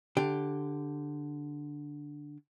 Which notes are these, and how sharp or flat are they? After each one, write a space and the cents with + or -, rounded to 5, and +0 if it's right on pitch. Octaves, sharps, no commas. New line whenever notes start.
D3 +0 G4 +0